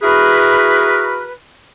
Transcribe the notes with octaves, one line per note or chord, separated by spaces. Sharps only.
E4 F#4 G#4 A#4 B4